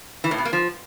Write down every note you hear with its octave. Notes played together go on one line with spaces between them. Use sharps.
E3
A2
B2
A#3
F3